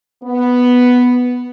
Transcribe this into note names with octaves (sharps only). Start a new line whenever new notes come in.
B3